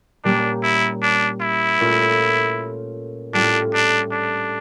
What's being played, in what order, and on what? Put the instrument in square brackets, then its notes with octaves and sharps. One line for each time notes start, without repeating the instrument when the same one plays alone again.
[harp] A#2 G3 A#3 C#4 [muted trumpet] D4
[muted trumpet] E4
D4
E4
[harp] A#2 A3 C#4 F4
[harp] A2 G3 C#4 F4 [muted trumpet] D4
[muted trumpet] D4
D4